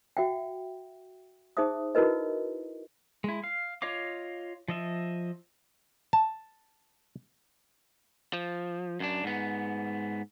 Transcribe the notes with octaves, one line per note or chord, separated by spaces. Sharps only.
F#4 E5 F#5 G5
D#4 G#4 C5 E5 D#6
D#4 E4 F#4 A#4 B4 D#5
G#3 E4
F5
F4 C#5 D#5 F5 D6
F3 D#5 E5
A5
F3
F#2 D4
G#2 B3